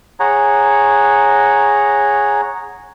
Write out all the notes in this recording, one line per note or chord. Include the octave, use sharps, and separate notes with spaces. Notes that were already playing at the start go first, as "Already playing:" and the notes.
G#4 C#5 F#5 A#5